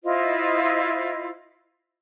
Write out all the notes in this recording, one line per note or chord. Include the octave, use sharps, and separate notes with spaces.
E4 F4 C5 D#5